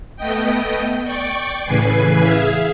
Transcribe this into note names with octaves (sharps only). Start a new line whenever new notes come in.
A3 B3 D#5 G5
D5 G5 C#6 D6
A2 C#3 E3 B4 G#5 C7
G#4 E5 F5